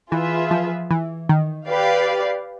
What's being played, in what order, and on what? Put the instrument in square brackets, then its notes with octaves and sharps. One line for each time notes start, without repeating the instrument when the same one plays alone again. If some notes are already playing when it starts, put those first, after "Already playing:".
[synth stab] E3 [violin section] F4 G#4 B4 E5
[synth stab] F3
E3
D#3
[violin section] G4 B4 D5 F5